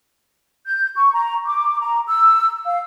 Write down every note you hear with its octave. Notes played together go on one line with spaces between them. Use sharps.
G6
C#6
A#5
D6
A#5
E6
F5